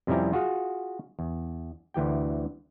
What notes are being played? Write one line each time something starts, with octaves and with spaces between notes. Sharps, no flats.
F2 C3 G3 C#4 E4 A#5
F4 F#4 G#4 F5
E2
D2 E3 G4 G5